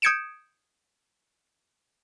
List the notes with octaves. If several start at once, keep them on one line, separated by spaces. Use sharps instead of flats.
D#6 G6 G#6 C#7 D7 E7